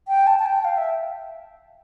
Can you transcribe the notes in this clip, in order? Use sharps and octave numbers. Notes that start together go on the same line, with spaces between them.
G5
A5
A5
G5
F5
E5